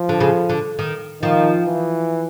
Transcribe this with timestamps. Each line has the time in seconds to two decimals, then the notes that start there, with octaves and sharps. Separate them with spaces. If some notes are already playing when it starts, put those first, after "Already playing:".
Already playing: F3
0.09 D3
0.20 C#3
0.49 D3
0.79 D#3
1.22 D#3 F3
1.66 E3